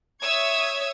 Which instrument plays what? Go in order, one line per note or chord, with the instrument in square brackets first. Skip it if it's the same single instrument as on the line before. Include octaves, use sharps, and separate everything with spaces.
[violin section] C#5 E5 C#6 D#6 E6 G#6